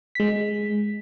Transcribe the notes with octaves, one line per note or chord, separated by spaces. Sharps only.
G#3 B6